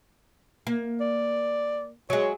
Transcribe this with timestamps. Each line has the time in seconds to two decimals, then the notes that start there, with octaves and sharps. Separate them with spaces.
0.67 A#3
1.01 D5
2.10 F#3 G#3 C#5